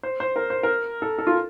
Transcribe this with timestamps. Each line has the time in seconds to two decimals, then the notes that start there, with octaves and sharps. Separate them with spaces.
0.03 C5
0.20 C5
0.36 A#4
0.50 C5
0.63 A#4
1.02 A4
1.18 A4
1.27 F4